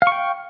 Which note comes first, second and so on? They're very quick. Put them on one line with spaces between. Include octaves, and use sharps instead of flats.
F5 C#6 G5